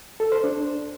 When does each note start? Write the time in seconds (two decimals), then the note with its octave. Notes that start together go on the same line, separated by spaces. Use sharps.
0.20 A4
0.32 C5
0.44 D4